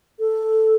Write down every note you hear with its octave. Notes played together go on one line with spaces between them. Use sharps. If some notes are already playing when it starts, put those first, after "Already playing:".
A4